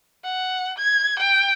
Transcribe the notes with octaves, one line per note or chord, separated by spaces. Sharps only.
F#5
G#6
G5